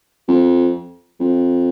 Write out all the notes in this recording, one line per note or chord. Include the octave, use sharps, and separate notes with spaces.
F2
F2